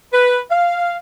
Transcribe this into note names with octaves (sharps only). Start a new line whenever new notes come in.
B4
F5